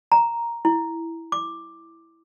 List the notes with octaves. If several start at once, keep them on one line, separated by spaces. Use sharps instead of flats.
A#5
E4
D6